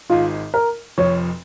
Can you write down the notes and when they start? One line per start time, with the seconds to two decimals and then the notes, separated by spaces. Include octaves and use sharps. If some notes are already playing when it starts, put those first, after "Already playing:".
0.10 G#1 G#2 G#3 F4
0.54 A#4
0.98 F1 F2 F3 C#5